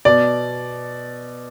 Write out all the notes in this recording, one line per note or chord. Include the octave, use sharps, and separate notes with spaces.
B2 D5